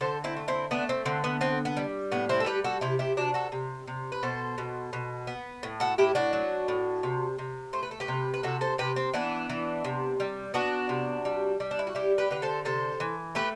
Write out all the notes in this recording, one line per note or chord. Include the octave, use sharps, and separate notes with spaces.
D3 A4 C5
C4 E4
A3
C4 E4
A3 B3 D4
C4
D3 C4
B3
B3 C4
B3
G3
A2 B3
C4 E4
A4
G3 G4 B4
F#4 A4
C3 E4 G4
E4 G4
C3 D4 F#4
F#4 A4
C3
C3
B4
B2 A4 C5
B2
B2
B3
A2
F#4 A4
A2 E4 G4
D4 F#4
F#3
A2
C3
C3
A3 C5
B4
A4
G4 B4
C3
B4
C3 F#4 A4
A4 C5
C3 G4 B4
C4
E3 B3 D4
E3
C3
G3
B3 D4 F#4
C3
G3
G3
D4
E4
F#4
G3 E4 G4
G4 B4
D3 B4
A4 C5
C3 A4 C5
E3
A3 G4 B4